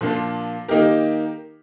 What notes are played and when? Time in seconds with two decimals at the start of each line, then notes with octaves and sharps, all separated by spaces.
0.01 A#2 F3 A#3 D4 F4
0.68 D#3 A#3 D#4 G4 A#4